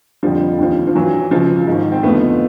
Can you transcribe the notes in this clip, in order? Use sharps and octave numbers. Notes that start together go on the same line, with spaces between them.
F2 D3 F3 G3
D#2 D3 F3
F3
G2 E3 F#3
C#2 C#3 F3
G#2 D#3
C4
F2 D3 F3 A3 B3